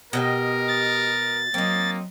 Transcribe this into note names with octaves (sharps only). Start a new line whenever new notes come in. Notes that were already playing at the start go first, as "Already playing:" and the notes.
B2 G4 A#4 D#5 G5
A6
F#3 A#3 C4 D#4